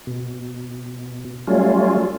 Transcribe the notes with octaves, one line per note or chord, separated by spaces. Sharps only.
B2
F#3 G3 A3 C#4 F4